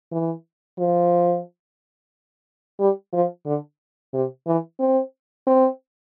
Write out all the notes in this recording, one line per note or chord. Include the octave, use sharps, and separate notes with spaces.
E3
F3
G3
F3
D3
C3
E3
C4
C4